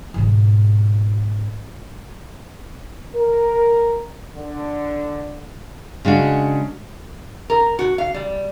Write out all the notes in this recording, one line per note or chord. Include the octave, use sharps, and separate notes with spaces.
G#2 B2
A#4
D3
C#3 G#3 D4 F#4
A#4
F#4
F5
G3